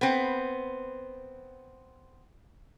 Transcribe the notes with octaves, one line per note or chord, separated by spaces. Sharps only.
B3 C4